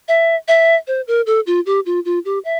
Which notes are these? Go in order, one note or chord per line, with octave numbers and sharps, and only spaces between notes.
E5
E5
C5
A#4
A4
F4
G4
F4
F4
G4
E5